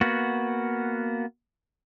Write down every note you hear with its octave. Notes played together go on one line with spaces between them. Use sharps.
A#3 B3 F#4